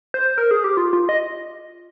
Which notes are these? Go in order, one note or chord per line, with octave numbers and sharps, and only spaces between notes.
C5
A#4
G#4
G4
F4
F4
D#5